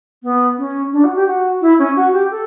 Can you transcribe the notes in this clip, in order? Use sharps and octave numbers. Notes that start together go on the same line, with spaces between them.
B3
C#4
D4
F#4
G4
F#4
E4
C#4
F#4
G4
A4